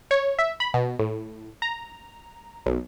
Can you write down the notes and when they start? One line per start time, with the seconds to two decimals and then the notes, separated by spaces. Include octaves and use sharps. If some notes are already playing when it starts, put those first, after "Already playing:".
0.11 C#5
0.39 E5
0.60 B5
0.74 B2
0.99 A2
1.62 A#5
2.66 B1